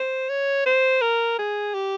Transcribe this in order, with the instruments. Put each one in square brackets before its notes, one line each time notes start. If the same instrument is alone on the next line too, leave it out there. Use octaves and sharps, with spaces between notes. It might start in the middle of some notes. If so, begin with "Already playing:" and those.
Already playing: [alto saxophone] C5
C#5
C5
A#4
G#4
G4